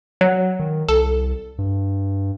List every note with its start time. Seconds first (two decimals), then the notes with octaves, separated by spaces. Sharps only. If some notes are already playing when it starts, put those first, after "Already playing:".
0.21 F#3
0.59 D#3
0.89 C2 A4
1.59 G2